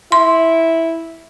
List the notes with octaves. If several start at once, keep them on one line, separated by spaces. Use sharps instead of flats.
E4 C6